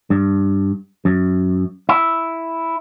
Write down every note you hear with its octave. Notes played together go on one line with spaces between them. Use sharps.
G2
F#2
E4